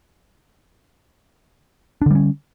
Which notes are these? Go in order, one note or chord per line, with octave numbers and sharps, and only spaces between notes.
D3 G3 C#4 D4